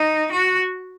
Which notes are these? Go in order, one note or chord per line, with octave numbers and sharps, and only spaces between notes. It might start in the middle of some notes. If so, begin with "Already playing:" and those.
Already playing: D#4
F#4